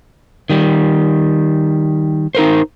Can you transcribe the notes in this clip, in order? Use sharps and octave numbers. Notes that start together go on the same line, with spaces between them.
D#3 G3
D#4 A#4 C5